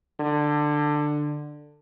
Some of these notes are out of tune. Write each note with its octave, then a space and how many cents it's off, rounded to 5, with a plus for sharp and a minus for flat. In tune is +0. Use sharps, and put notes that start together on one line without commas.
D3 +15